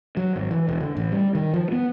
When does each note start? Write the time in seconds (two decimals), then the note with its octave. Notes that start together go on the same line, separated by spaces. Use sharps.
0.17 F#3
0.35 G#1
0.51 E3
0.68 E1
0.81 D3
0.97 A1
1.12 G3
1.35 D#3
1.53 F3
1.72 B3